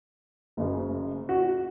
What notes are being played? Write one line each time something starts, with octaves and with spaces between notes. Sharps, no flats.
F#1 F#2 C#3
F#4